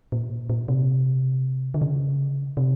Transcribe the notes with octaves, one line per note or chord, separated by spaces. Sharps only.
A#2
A#2
C3
D3
C#3
C3